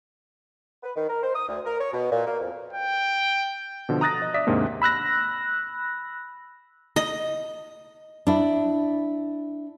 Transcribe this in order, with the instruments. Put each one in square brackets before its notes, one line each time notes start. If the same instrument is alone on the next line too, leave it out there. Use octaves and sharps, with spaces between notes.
[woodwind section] B4
D#3
A#4
C5
D#6
D2
A#4
C#5
B2
A#2
A#3
F2
[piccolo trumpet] G5
[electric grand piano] B2 D3 F3
A#5 D#6 F#6 A6 A#6
D#5
D5 E5 D#6 B6
D#2 G#2 C3 A#3 D4
[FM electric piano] B5 E6 F#6 A#6
[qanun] D#5
[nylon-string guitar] D4 E4